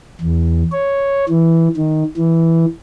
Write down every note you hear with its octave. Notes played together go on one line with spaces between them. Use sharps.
E2
C#5
E3
D#3
E3